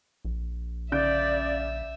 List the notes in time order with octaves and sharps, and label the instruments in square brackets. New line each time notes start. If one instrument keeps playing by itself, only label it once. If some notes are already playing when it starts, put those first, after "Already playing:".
[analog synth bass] A#1
[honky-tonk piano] C#3 G6 D7 [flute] D5 [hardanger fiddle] E5